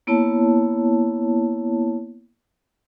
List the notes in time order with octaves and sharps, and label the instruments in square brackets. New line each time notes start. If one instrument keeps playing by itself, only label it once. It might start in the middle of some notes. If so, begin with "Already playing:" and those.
[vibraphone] A#3 B3 E4 C#5 A5